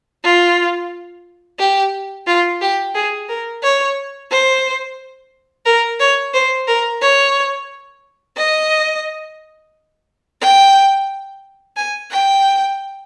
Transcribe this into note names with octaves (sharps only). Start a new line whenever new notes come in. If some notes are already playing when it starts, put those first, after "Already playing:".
F4
G4
F4
G4
G#4
A#4
C#5
C5
A#4
C#5
C5
A#4
C#5
D#5
G5
G#5
G5